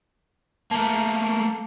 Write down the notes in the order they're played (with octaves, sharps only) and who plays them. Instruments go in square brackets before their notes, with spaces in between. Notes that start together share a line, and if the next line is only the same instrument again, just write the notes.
[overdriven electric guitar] A3 A#3 [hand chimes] A5 A#5